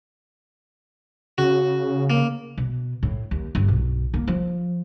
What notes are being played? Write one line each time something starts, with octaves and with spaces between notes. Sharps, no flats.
C#3 F#4
A#3
B2
A2
D#2
G1
B1
A#3
F3